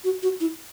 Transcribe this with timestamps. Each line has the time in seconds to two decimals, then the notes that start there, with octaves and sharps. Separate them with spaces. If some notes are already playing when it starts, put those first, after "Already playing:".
0.04 F#4
0.23 F#4
0.40 E4